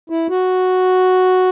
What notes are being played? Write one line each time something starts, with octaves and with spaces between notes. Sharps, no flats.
E4
F#4